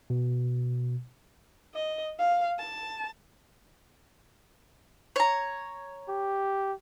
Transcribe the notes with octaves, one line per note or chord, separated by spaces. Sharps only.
B2
D#5
F5
A5
C#5 A#5
G4